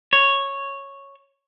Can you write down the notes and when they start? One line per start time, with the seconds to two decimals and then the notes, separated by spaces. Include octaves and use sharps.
0.13 C#5